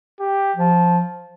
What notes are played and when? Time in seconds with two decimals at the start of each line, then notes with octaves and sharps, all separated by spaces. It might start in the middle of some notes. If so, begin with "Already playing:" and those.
0.20 G4
0.56 F3